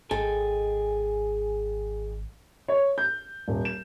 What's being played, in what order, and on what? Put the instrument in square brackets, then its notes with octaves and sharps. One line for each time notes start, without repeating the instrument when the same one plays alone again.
[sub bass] G#1 [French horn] G#4 [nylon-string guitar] A4 [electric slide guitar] D#5 G5 G#5
[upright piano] C#5
G6
D#1
E7